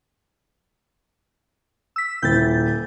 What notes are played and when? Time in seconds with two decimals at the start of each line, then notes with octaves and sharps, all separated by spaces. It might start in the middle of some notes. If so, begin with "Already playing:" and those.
1.96 E6 B6
2.22 D#1 E4 G5 G6 A6